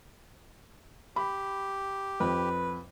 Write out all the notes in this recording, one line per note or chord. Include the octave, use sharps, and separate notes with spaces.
G4 B5
F2 B4